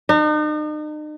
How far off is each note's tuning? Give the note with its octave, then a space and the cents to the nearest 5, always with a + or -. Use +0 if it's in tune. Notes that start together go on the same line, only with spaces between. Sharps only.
D#4 -40